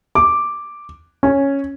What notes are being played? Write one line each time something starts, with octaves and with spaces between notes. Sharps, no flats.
D6
C#4